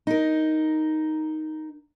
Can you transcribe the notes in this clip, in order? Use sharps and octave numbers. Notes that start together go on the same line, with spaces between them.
D#4 A#4